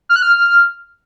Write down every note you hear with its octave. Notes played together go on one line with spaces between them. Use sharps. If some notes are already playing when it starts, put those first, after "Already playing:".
F6
F#6
F6